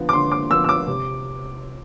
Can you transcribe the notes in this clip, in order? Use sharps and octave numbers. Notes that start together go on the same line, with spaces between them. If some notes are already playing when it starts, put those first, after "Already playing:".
Already playing: D3 F3 B3
D6
D3 C6
D6
F3 B3 E6
E6
D6
C3